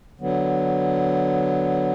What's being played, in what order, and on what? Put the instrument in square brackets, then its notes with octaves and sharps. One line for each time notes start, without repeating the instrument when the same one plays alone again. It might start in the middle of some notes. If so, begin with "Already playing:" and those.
[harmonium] D3 F#3 B3